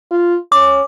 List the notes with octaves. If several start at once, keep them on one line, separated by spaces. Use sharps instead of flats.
F4
C#4 D6